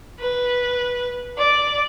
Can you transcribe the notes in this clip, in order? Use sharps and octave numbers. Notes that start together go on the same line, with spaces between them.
B4
D5